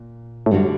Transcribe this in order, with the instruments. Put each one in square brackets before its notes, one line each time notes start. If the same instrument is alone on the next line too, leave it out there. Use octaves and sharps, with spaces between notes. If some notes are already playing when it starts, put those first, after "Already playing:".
Already playing: [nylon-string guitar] A#2
[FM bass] A2
[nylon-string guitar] D2 D3 G3 D4 F#4 [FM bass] G2